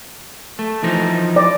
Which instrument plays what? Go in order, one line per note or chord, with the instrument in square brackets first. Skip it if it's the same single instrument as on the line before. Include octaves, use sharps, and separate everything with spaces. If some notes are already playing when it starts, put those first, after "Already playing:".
[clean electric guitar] A3
E3 F3 D#4
[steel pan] D5